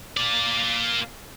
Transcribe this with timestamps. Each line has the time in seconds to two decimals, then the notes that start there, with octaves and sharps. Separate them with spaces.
0.17 A#3 D5